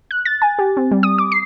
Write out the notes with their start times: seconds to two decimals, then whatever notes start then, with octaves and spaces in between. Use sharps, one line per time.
0.11 F#6
0.25 A6
0.42 G#5
0.59 G4
0.77 C4
0.91 G3
1.03 D#6
1.18 D6
1.32 C7